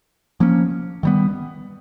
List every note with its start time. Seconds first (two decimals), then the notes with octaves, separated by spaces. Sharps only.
0.40 F3 A#3 C#4
1.03 D#3 G3 B3